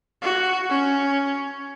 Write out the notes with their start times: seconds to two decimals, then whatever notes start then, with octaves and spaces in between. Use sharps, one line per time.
0.22 F#4
0.70 C#4